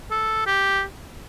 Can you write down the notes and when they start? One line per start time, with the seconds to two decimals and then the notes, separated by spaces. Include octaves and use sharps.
0.11 A4
0.46 G4